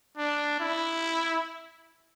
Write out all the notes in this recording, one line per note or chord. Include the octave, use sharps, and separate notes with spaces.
D4
E4